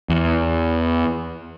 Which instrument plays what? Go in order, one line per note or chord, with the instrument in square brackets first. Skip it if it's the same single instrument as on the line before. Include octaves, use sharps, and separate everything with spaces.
[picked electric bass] E2